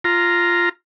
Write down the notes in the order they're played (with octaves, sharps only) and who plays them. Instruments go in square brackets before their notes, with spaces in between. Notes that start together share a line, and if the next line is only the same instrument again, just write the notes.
[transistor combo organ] F4 A#5